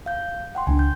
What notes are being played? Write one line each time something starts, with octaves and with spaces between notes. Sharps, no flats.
F5 G6
F#5 G5 C6
C#2 C#4 D4 G#5
G6